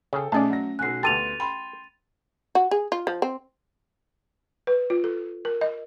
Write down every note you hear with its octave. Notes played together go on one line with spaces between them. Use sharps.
C#3 G#4 A4 G5
B1 A3 C#4 G#4 D5 D#5 A5
F#3 A#6
B1 F#4 G#5 F#6 C7
D2 B3 G4 A4 C6 A6 D#7 F7
G5 B5 C6
F#4
G#4
F4
F3
C4
B4
F4
A4
A#4
D#5